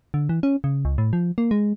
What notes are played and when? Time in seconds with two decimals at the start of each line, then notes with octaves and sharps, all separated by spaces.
0.14 D3
0.29 E3
0.43 C#4
0.64 C#3
0.85 C#2
0.98 A2
1.13 F3
1.38 A#3
1.51 G#3